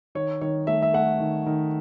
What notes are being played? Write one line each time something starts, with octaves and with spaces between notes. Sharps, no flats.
D#3 C#5
D#3 C#5
A3 E5
E5
A3 F#5
D#3
D#3